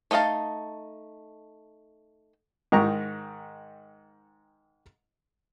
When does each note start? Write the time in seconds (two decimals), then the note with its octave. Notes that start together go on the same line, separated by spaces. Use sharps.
0.11 A3 D#4 D#5 F5 A5
2.72 G#2 D#3 G5 A#5 C#6